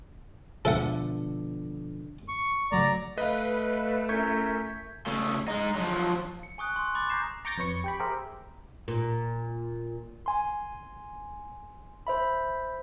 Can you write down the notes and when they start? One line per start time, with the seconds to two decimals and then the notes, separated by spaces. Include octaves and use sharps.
0.65 B2 D3 F3 A4 E5 F#5
2.28 C#6
2.72 C#3 F#3 A3 D5 A#5
3.18 A3 B4 D#5 F5
4.09 C#4 E4 A#4 C#6 G6 G#6 B6
5.06 C#3 A3
5.48 G#3 D#4
5.75 F3 F#3
6.43 C#7
6.58 G#5 C#6 D#6 F#6
6.76 C6 D#6
6.95 B5 D6 A6
7.10 A#5 D6 G6 A#6 C7 E7
7.45 A#5 C#6 D6 G6 A6 A#6
7.58 F2 B4 C#5 C#6
7.84 G4 G5 B5
8.00 G4 G#4 A#4 C5 E5 G5
8.88 A#2
10.26 G#5 C6
12.07 C5 E5 B5